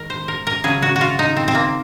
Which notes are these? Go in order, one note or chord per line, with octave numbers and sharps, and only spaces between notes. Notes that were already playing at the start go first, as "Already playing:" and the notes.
Already playing: D#3 G#3 A#4
C5
A#4
A#4
C#3 F#3 G#4
F#4
F#4
F4
D#4
C4
C4
A#3